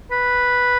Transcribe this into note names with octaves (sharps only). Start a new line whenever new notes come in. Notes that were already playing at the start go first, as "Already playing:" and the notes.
B4